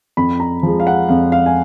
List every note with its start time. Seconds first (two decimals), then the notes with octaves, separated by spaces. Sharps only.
0.17 F2 B5
0.40 A#5
0.63 F3 G#3
0.80 F5
0.87 F#5
1.09 F2 F5
1.32 F5
1.46 G#5